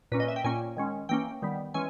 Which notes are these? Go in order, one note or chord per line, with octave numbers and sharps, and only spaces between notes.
A#2 A#3 C#4 B4
D#5
E5
G5
A#2 A#3 C#4 G#5
D#3 G#3 C#4
E3 A#3 C#4 G5
D#3 G3 B3
E3 G#3 C#4 G#5